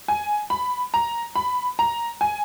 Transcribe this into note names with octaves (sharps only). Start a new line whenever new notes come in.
G#5
B5
A#5
B5
A#5
G#5